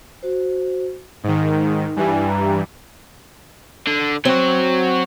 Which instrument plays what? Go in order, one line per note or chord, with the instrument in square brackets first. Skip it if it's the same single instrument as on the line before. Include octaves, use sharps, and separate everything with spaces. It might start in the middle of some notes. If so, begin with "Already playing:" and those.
[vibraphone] F#4 C5
[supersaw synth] G#2 D#3 [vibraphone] D#4
[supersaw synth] G2 E3 G3 [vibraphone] G#5
[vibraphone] A#5
[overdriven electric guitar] D3
[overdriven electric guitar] F#3 F#4 [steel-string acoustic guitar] C4